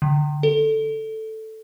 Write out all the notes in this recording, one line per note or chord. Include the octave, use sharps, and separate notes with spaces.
D3
A4